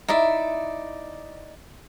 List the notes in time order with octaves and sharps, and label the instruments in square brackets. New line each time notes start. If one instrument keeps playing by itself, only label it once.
[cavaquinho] D#4 E4 D5 E5